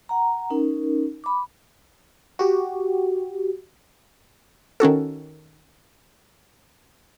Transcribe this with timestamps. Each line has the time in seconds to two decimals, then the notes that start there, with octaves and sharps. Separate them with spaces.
0.09 F#5 A#5
0.50 C#4 D#4 A#4
1.24 B5 D6
2.39 F#4 G4
4.80 D#3 C#4 F#4 A4